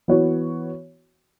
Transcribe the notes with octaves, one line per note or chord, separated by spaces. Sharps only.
E3 B3 F#4 C#5